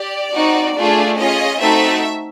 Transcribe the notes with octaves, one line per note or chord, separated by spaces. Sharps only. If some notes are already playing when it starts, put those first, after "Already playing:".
Already playing: G4 D5
C4 D#4 F#4
A3 D4 F4 G#4
C#4 F4 G#4 D#5
A3 C4 D#4 F#4 A4 E5